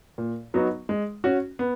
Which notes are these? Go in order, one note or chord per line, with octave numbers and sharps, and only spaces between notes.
A#2
F#3 B3 D#4 F#4
G#3
C#4 F#4
B3